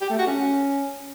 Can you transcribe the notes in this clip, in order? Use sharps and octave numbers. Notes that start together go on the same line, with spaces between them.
G4
A3
F#4
C#4